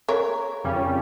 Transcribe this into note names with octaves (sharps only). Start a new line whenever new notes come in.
A#4 C#5
F2 C#3 G3 C#4